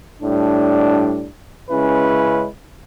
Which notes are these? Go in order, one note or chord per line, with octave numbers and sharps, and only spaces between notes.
A2 G3 D4
C#3 G#3 C#4 E4 B4